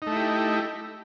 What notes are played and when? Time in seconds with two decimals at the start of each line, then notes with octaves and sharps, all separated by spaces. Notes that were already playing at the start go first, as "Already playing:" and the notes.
0.02 D#4
0.07 A3
0.11 E4
0.16 G4